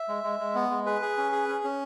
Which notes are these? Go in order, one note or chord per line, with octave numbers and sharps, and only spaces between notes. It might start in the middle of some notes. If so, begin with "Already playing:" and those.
Already playing: E5
G#3
G#3
G#3
B3
G#3
G#4 B4
G#4
C#4
G#4
C#4
C#4